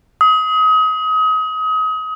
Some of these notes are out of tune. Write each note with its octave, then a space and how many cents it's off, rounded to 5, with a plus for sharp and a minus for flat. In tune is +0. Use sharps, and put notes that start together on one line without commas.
D#6 +30